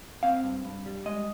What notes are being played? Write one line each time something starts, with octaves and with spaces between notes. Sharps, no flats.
C4 F5
G2
G2
G3
G#3 D#5